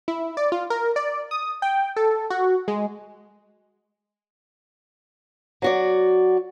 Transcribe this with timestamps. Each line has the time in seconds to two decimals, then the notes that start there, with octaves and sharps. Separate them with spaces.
0.08 E4
0.37 D5
0.52 F4
0.70 A#4
0.96 D5
1.31 D#6
1.62 G5
1.96 A4
2.30 F#4
2.68 G#3
5.62 F#3 F#4 D5